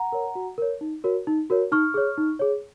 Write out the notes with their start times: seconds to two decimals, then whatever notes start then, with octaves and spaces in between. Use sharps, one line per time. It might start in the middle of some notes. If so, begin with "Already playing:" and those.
Already playing: F#5 A#5
0.12 A#4 C#5
0.35 F#4
0.58 A#4 C#5
0.81 D#4
1.04 F#4 A#4 C#5
1.27 D#4
1.50 F#4 A#4 C#5
1.72 D#4 C#6 F6
1.94 G#4 C#5
2.18 D#4
2.39 G#4 C#5